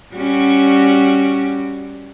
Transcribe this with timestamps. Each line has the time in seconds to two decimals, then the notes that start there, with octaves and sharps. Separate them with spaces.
0.15 G3 C#4 F#4